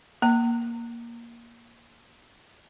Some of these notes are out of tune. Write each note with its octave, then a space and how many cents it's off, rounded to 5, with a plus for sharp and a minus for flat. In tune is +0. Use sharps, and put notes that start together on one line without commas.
A#3 +10 A#5 -35